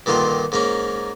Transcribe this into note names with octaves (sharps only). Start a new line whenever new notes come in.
G2 A#2 D3 D#3 F4
G#2 A#3 C#4